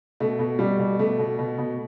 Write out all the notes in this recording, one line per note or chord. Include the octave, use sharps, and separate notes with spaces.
B2 A3
B2
B2 G3
B2
B2 A3
B2
B2
B2